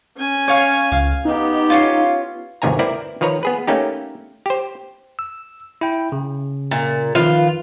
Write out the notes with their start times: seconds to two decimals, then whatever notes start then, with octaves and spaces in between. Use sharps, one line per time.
0.17 C#4 G#5
0.48 C#5 F5 C#6
0.92 C#2 F5
1.25 B3 D#4 G4
1.70 C#4 F4
2.62 G1 D2 C3 D#3 G#5 A#5
2.79 C4 E4 A#4 B4 D5
3.21 D#3 F3 B4 C#5 A#5
3.43 B3 G#4 B4
3.67 A3 A#3 C#4 D#4 G4
4.46 G4 C5
5.19 E6
5.81 E4 G5
6.12 C#3
6.71 A#2
7.15 D#3 F3 F4 B4